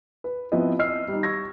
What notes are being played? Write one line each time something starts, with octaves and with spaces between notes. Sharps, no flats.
B4
F3 B3 C4 E4 B4 D#5
D#5 E6 F6 C7
G3 D#4
C#6 E6 G#6 A#6